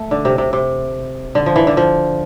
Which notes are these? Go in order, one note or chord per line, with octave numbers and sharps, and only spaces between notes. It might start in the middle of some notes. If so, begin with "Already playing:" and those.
Already playing: A3
D3
C3
C3
C3
D3
F3
E3
D3
F3